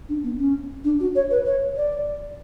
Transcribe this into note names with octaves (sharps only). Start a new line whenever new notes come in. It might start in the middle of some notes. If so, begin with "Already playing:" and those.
D4
B3
C#4
D4
F#4
C#5
B4
C#5
D5